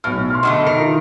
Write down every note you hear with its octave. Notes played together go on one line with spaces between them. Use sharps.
B1 A2 F6
C6 F6
B2 D3 A3 D#5
D#3 A#4
E4 F4